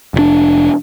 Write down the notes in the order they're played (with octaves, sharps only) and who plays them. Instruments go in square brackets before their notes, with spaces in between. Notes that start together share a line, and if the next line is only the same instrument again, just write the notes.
[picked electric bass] F1 A2 D4